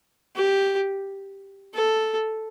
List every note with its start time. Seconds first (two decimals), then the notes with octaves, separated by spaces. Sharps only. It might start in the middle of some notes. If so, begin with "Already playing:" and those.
0.36 G4
1.74 A4